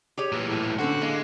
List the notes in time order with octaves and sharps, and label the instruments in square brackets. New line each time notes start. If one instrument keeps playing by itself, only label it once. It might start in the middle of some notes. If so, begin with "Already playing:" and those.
[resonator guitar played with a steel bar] G4 G#4 C#5
[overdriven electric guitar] A#2 E3
[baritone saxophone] A2
[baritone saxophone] D3 [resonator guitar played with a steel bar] C#4 E4 C5 [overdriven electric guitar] F#4
[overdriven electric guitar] G#3 [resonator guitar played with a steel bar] A#3